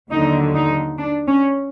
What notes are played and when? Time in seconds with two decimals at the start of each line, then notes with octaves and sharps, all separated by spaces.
0.11 D#2 D3 F#3 D#4
0.55 D#4
0.98 D4
1.27 C#4